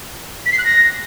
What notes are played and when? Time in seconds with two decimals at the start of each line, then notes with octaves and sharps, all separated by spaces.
0.46 B6
0.52 C7
0.58 F#6
0.65 A#6